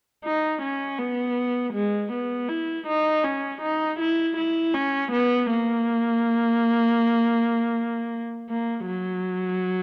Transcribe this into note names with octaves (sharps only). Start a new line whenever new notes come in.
D#4
C#4
B3
G#3
B3
E4
D#4
C#4
D#4
E4
E4
C#4
B3
A#3
A#3
F#3